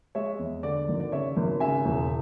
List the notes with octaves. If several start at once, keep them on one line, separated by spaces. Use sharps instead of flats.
G#3 C#5 E5
E2
D3 D5
G#1
D5
C#3 C#5 E5
G#1
C#3 E5 G#5
E1